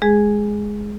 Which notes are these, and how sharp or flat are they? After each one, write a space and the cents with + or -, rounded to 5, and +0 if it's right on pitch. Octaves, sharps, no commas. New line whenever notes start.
G#3 +0 G#4 +0